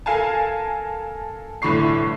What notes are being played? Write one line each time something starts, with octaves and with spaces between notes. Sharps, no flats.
A4 A#4 F5 G#5 A5
G1 A2 D3 B5 C#6 C7